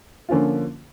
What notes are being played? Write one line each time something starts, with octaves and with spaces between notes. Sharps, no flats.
D3 F3 A#3 C#4 F4